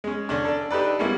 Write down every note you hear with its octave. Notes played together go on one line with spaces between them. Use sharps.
G#3 C#4
D3 C#4 D4
A4 D5
D4 D#4 G4 A4 B4 D5
G3 G#3 A#3 B3 C#4 E4